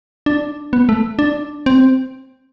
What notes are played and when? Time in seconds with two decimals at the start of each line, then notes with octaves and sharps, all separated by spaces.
0.26 D4
0.73 B3
0.89 A3
1.19 D4
1.66 C4